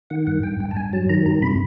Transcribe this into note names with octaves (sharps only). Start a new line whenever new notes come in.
D#3 F#5
G2 F#5
G2 G5
G2 G5
A5
G2 G#5
F#3 A5
D#3 A#5
G2 A#5
C3 B5